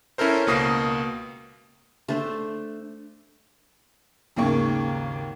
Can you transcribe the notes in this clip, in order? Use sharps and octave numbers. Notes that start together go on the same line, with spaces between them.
C#4 E4 A4 A#4 C5
C#2 B2 A#3 D#6 A#6 C7
A3 D4 C5
G#1 D#2 C#3 A#3 C#6